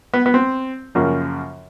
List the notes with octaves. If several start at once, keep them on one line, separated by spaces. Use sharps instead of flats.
B3
B3
C4
F#2 C#3 F3 A#3